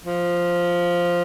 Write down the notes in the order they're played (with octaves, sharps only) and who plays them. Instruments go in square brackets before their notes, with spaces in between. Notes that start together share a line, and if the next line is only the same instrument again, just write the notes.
[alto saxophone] F3